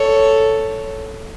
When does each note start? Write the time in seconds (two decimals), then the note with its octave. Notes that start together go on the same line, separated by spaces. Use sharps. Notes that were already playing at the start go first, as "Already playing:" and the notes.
Already playing: A4 C#5